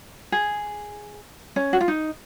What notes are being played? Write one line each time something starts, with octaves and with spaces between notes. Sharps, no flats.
G#4
C#4
F#4
F4
D#4